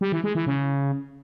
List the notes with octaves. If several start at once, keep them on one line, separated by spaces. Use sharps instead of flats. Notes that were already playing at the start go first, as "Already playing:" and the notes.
G3
E3
G#3
E3
C#3